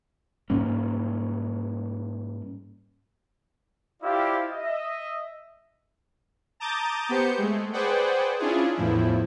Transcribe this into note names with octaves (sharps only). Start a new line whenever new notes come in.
G#2 G3 A#3 C#4
E4 F4 G4 C5 D5 F5
D#5 E5
A5 A#5 D6 D#6 G6 A6
B3 G4 C5 G6 C#7
G#3 A3
G#4 B4 C5 D5 F#5 G5
C#4 D4 E4 F4 G#4
E2 A2 F3 E4